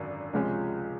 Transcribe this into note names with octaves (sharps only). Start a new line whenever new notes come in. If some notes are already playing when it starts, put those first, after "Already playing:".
Already playing: G#1 F#2 D3
C#2 C3 F3 G#3 C#4